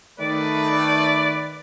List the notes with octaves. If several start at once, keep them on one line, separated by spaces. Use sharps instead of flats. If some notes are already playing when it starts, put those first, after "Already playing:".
D#3 A3 B4 D5